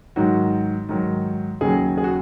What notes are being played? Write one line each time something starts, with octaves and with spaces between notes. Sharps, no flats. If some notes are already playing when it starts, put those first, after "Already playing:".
G#2 D#3 F#3 F#4
G#2 D#3 F#3
D#2 C#3 F#3 G#4
G#4
F#4